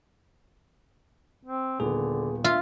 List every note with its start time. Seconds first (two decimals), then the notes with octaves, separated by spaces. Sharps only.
1.45 C4
1.80 D#1 D3 B3 G#4
2.44 F4 E5 C6